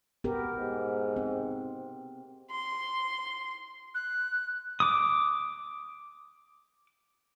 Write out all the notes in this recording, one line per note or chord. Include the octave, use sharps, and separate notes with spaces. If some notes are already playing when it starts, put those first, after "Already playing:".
B3 G4 A#4
G#2
C4
C6
F#6
D6 D#6